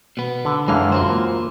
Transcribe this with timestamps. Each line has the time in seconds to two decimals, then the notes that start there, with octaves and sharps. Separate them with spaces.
0.17 B2 B3
0.45 D3
0.68 F#2 D3 E3 G#3 F5
0.92 F4 F#4 C5
1.10 A#3